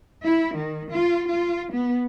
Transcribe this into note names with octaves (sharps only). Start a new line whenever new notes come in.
E4
D#3
F4
F4
B3